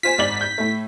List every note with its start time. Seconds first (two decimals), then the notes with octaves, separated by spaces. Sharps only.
0.03 F4 C5 G#5 B6
0.18 G#1 D5 F#7
0.41 G6
0.58 A2 A3